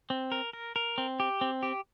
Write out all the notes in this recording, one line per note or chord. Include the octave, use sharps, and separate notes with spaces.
C4
A#4
A#4
A#4
C4
G4
C4
G4